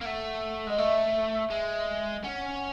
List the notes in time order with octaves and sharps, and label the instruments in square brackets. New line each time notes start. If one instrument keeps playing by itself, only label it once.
[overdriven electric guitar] A#3
[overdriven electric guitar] A3 [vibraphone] F#5
[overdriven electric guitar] G#3 [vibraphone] D#5
[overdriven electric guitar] A3 [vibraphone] E5
[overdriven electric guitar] G#3
[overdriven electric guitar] C#4 [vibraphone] F#5